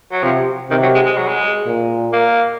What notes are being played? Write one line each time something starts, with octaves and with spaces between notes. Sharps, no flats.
F#3
C3 F3
C3 D#3
F#3
G#3
G#3
F#3
G#3
A#2
A#3